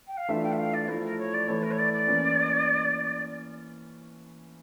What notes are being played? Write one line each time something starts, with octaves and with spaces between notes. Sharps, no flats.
G5
F5
E3 A3 D4 F4 E5
G5
E5
F5
D5
F3 A3 E4 A#4
A#4
C#5
D5
E3 A3 E4 C#5
A#4
C#5
D5
D5
E3 A#3 C#4